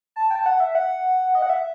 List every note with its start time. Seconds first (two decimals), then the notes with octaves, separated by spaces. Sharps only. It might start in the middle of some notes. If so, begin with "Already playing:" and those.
0.16 A5
0.31 G5
0.35 A5
0.46 F#5
0.60 E5
0.75 F#5
1.35 D#5
1.42 F#5
1.50 E5